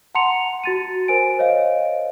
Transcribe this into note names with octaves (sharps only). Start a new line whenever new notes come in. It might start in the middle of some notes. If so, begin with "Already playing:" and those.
F#5 A5 A#5 C6 C#7 F7
F#4 A6 D#7
A#4 C5 G#5 D7
C5 C#5 D#5 F5